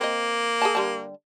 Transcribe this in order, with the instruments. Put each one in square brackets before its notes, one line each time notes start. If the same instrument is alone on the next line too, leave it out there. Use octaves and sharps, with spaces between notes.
[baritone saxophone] A#3 [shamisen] C4 D#5
[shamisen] G#4 G#5 A5
D3 G3 A5